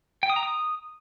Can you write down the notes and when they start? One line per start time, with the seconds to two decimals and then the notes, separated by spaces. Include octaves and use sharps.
0.23 G5
0.30 D#6
0.36 A#5
0.43 D#6